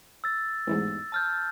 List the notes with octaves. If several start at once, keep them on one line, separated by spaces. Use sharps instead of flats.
E6 A6
A1 E2 G#2
A5 F6 G6 A6